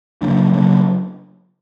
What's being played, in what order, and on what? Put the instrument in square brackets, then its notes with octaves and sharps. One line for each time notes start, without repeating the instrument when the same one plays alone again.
[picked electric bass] C#3 F#3 A#3 D4
C#3 F#3 A#3 D4